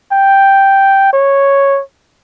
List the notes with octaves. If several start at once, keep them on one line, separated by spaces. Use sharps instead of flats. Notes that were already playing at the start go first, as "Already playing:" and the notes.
G5
C#5